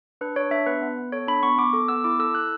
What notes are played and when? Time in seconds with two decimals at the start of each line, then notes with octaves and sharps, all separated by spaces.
0.21 D4 B4
0.36 D4 C#5
0.51 D4 E5
0.66 B3 B4
0.82 B3
0.97 B3
1.12 A4 C#5
1.28 D4 B5
1.43 B3 C#6
1.58 B3 D6
1.73 A4 D6
1.88 B3 E6
2.04 E4 D6
2.19 A4 E6
2.34 E4 F#6